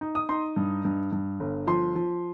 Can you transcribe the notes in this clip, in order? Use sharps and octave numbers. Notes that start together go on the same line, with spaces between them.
D#4
D#6
D#4 C6
G2
G2
G2
G1
F3 C6
F3